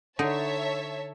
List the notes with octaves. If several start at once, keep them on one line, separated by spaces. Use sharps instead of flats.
D3 D#4 C#5 E5 A5